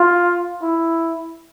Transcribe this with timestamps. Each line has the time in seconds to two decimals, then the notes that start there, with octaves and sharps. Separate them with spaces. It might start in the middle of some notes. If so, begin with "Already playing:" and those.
Already playing: F4
0.62 E4